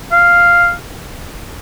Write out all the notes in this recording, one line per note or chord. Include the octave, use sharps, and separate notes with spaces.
F5